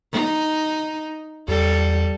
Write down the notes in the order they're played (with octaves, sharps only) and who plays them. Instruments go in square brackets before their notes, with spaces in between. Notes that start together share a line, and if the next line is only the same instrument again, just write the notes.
[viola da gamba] D#4
[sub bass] E2 [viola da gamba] G3 A4